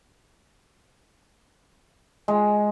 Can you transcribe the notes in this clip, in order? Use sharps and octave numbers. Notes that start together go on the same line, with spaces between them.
G#3